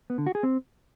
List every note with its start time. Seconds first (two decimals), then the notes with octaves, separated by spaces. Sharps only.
0.10 B3
0.18 D3
0.26 F#4
0.35 G#4
0.43 C4